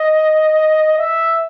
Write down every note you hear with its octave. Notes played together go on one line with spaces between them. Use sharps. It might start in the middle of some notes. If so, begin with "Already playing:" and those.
Already playing: D#5
E5